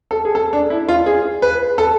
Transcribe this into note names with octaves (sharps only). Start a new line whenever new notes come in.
A4
G#4
A4
D4
E4
F4
G#4
B4
A4